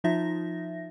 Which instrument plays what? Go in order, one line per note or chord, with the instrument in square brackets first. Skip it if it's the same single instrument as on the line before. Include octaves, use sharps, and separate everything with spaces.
[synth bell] F3 D#4 F4 E5 A#6